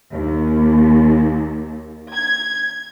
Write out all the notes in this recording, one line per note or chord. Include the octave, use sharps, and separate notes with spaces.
D#2
G#6